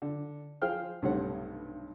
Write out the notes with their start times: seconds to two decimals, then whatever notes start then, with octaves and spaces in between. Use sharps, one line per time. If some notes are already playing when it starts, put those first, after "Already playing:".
0.02 D3
0.62 F3 G#4 C5 F5 G5 F6
1.02 B1 G2 C3 A3 C#5 F#5